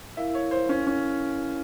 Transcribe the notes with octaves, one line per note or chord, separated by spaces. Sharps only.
E4 A#4 E5 F5
C#5
C5
C#4
C#4